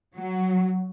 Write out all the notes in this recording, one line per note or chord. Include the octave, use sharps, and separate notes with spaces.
F#3